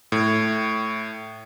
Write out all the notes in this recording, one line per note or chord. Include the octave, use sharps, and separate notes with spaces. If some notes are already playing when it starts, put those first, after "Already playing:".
A2